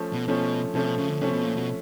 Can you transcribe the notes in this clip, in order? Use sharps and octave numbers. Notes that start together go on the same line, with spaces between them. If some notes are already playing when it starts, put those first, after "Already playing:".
Already playing: F3 A3 C#4
B2
B2 F3 A3 C#4
C3 F3 A3 C#4
B2
C#3
D3
C3 F3 A3 C#4
B2
A#2
B2